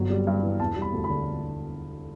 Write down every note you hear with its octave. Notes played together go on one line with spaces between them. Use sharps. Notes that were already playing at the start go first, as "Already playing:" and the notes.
Already playing: G1 F#3
G3
G2
E3
E1 A5
G3
B5
D2
B5
D3